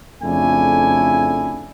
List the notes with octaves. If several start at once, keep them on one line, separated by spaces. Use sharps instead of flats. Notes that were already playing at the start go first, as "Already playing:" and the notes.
F2 C#3 A3 D4 E4 G#5